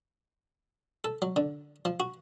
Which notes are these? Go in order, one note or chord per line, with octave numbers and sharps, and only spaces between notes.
A4
F#3
D3
F3
F#4